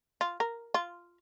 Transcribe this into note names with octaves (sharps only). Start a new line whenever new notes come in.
F4
A#4
F4